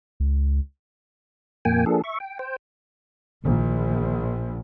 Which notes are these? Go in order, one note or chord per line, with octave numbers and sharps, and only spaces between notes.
C#2
F2 A#2 A#3 G5 G#5
F3 A#3 D4 G#4 A4
E5 C#6
G5
C5 G5
A#1 A#2 D#3 E3